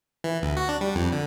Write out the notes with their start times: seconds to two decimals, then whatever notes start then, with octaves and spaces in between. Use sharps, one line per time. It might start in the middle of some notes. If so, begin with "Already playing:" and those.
0.24 E3
0.42 D2
0.57 F#4
0.69 D4
0.81 G3
0.95 F2
1.12 D3